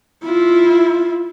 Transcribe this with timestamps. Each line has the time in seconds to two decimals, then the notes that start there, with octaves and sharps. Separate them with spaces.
0.24 E4 F4